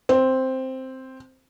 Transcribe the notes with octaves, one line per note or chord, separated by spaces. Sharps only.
C4